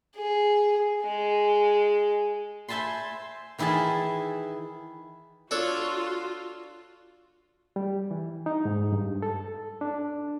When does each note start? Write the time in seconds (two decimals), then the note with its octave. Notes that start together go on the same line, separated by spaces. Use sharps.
0.16 G#4
1.03 G#3
2.68 C5 E5 G#5 A5 B5 C6
3.58 D#3 E3 E4 G#4 G#5 A5
5.51 D4 F4 F#4 A4 C#5
7.76 G3
8.11 E3
8.46 D#4
8.65 G#2
8.92 G2
9.22 A4
9.81 D4